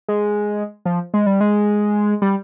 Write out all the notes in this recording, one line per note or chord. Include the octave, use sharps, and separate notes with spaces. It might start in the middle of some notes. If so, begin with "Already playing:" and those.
G#3
F3
G#3
G3
G#3
G3